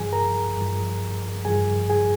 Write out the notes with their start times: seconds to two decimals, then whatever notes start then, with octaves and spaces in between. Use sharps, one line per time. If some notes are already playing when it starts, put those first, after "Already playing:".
Already playing: G2 F3 G#4 G#5
0.13 A#4 A#5
0.57 G2 F3
1.45 G2 F3 G#4 G#5
1.90 G#4 G#5